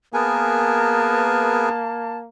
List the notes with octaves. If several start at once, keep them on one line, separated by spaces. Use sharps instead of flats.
A#3 B3 G#4 A#4 B4 G#5 A5